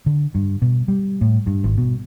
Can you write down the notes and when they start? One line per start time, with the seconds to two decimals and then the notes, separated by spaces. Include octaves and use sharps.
0.06 D3
0.35 G2
0.62 B2
0.88 G3
1.21 A2
1.47 G2
1.64 G#1
1.77 B2